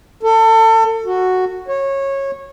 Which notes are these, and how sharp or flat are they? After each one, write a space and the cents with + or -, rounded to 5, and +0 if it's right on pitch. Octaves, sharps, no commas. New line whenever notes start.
A4 +30
F#4 +0
C#5 -20